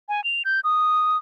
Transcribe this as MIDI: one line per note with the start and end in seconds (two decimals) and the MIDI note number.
0.09 0.23 80
0.24 0.43 101
0.45 0.60 91
0.64 1.17 87